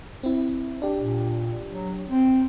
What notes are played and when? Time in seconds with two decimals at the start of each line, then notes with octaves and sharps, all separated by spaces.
0.23 C4 E4
0.82 D4 G4
0.99 A#2
1.68 F#3
2.08 C4